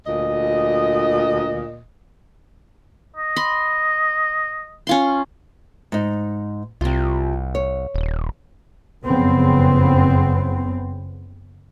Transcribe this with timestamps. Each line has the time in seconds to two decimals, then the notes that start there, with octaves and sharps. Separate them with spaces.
0.07 D2 A#2 D#5
3.16 D#5
3.36 B5 C6
4.87 C#4 F4 C6
5.92 G#2 D#4
6.81 C2 C3 F4
7.55 C#5
7.94 D#1
9.05 F#1 F2 C#3 B3 C4